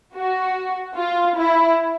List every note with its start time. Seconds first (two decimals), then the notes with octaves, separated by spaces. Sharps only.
0.15 F#4
0.97 F4
1.37 E4